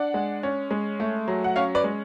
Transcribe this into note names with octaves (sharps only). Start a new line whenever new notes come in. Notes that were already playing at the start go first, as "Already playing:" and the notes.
Already playing: D4 D5 F#5
G#3
C#4
G#3
A3
F#3
F#5
C#4 C#5 F5
B4 D5
G#3